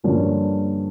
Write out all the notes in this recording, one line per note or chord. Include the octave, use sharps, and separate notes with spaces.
G2 D3 F3 A#3 C#4